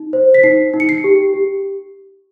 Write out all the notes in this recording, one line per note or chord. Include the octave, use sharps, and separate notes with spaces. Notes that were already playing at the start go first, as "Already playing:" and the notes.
Already playing: D#4
C5
B6
D#4 C7
D#4
C#7
C7
G4
G4